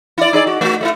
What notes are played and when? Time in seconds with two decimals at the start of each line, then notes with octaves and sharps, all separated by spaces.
0.18 E4 D5
0.33 D#4 G#4 D5
0.47 F#4
0.61 A3 F#4
0.81 A3 B3 E4